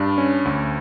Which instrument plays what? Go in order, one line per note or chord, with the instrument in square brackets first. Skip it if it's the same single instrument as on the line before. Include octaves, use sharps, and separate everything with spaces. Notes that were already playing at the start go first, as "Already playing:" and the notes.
Already playing: [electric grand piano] G2 D4
C#4
D2